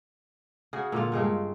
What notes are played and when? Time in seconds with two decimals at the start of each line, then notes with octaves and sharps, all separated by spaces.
0.73 C#3 F#4 G#4
0.92 A#2 D3 F4
1.12 G2 C#3 G#3 C4